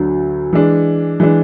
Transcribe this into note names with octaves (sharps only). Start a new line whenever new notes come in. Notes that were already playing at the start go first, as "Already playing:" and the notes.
Already playing: D2 D3 F#3
E3 G#3 D4
E3 G#3 D4